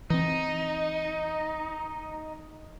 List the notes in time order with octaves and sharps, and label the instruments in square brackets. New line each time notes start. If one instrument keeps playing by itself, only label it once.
[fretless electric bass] E3 C4 [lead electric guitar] D#4